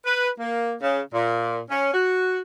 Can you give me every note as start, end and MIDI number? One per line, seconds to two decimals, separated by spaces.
0.05 0.28 71
0.38 0.74 58
0.81 1.00 49
1.13 1.60 46
1.69 1.89 61
1.93 2.38 66